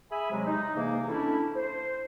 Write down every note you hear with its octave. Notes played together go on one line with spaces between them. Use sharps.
G#4 E5 G#5 B5
C3 F#3 G#3
D#4
G#2 C3 E3 A#3
A3 C#4 D4 E4
C5